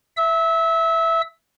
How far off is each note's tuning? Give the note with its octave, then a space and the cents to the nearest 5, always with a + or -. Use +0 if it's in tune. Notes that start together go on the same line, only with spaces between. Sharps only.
E5 +5 E6 -25